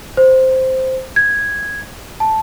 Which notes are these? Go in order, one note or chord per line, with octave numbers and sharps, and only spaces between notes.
C5
G#6
A5